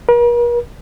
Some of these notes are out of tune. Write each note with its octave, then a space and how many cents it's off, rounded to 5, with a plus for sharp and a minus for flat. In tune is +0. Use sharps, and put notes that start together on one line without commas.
A#4 +45